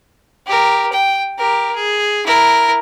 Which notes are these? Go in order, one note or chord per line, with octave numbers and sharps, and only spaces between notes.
G4 A#4
G5
G4 A#4
G#4
E4 A#4